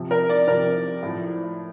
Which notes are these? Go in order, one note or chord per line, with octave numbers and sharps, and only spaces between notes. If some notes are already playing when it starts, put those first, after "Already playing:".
Already playing: C3 F3
A#4
D5
C3 F3 A#4
A2 F3